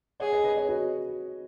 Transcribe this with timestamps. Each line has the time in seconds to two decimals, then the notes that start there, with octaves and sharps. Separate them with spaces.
0.20 G#4 C#5 F#5
0.32 B4 D#5
0.44 B4 D#5
0.56 G#4 C#5
0.68 F#4 B4